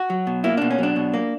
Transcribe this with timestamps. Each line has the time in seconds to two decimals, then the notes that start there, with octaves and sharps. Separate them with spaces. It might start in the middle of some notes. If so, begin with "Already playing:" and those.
Already playing: F#4
0.10 F#3
0.27 B2
0.44 A#3 E4
0.57 B2 D4
0.71 C#4
0.79 F#3 D4
0.96 B2
1.14 A#3